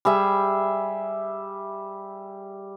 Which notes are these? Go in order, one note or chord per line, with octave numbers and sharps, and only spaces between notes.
G3 G#4 E5